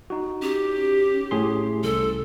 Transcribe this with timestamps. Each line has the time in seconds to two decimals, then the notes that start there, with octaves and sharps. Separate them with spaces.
0.10 D#4 F#4
0.42 C#4 G4
1.31 A2 G#4 C6
1.84 C2 A4